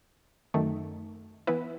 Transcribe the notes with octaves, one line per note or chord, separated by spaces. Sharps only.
F#2 D#3 A3
E3 B3 E4 B4